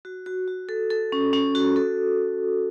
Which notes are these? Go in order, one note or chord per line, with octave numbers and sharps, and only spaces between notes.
F#4
F#4
F#4
A4
A4
C#4
C#4
F#4
A4